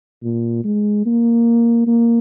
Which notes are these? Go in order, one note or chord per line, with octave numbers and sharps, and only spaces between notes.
A#2
G#3
A#3
A#3